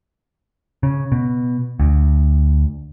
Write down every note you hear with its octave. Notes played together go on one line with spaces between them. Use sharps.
C#3
B2
D2